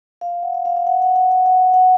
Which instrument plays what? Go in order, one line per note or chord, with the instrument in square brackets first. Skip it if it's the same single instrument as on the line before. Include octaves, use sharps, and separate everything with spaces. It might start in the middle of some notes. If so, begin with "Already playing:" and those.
[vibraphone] F5
F#5
F5
F5
F5
F#5
F#5
F#5
F#5
F#5
F#5